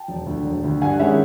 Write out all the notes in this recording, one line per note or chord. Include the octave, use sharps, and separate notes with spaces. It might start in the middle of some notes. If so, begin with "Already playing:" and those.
Already playing: G5 A5
E1
D2 D3
E1
D2 D3
G2 F#5 G#5
D#3 G#3 C#4 E4 E5 F#5